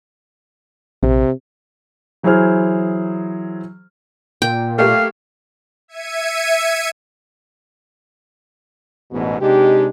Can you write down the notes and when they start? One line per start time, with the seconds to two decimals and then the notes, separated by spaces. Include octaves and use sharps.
1.03 A#1 C3
2.23 E3 F#3 E4 G#4 C5 F6
4.42 A#2 G5
4.78 A3 A#3 G4 F5
5.88 E5 G#6 C#7 D#7
9.12 A1 E2 G#2 B2
9.41 C3 G#3 D4 D#4 G4